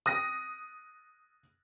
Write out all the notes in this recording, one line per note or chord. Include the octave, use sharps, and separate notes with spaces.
D#6 A#6